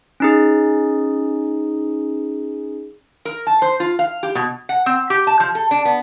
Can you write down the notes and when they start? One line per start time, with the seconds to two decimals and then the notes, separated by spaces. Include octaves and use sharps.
0.20 C#4 D#4 G#4
3.25 A#4
3.47 A5
3.62 C5
3.80 F4
3.99 F5
4.23 G4
4.35 B2
4.69 F#5
4.86 C4
5.10 G4
5.27 A5
5.40 F3
5.55 A4
5.71 D4
5.85 B3